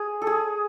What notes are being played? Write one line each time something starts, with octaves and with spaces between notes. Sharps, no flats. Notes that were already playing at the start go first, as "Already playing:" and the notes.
Already playing: G#4
A4
G#4